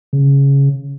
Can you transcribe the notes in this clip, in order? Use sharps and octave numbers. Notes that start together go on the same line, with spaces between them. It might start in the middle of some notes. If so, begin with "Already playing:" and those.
C#3